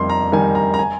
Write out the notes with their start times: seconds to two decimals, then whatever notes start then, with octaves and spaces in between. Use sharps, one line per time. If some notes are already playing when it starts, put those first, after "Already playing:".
Already playing: F2 D#3 G3 C6
0.10 A#5
0.32 D#3 G3 G#5
0.55 A#5
0.74 A#5
0.79 G#5